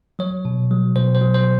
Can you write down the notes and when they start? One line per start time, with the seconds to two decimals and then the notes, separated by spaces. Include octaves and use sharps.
0.19 F#3 C#5
0.45 B2
0.71 F#3
0.96 B2 C5
1.15 C5
1.21 F#3
1.34 C5